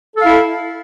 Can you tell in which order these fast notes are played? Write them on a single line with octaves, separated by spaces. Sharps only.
A4 F5 E4